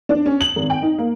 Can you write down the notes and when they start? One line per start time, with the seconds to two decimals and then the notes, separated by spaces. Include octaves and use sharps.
0.09 D4
0.26 C#4
0.41 F#7
0.56 G#1
0.70 G5
0.82 D#4
0.98 A#3